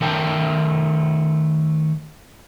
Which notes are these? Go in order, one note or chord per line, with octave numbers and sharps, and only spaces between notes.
D#3 A3 A#4 E5 G5 A5